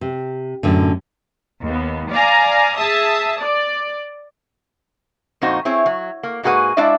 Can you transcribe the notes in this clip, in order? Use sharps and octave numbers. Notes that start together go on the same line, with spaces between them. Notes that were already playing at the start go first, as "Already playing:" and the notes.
C3
F#2 A2 D3
D#2 B3
D5 F5 G#5 A#5
G#4 E5 A5 D#6
D5
F2 A#2 D#4 F#4 C5
C4 E4 G#4 C#5
F#3
A#3
G#2 A#3 F#4 G#4 B4 F#5
G#3 D4 E4 D5 E5 F5